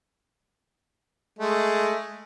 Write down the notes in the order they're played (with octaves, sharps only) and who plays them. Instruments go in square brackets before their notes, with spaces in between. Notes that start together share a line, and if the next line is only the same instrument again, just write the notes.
[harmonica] G#3 A3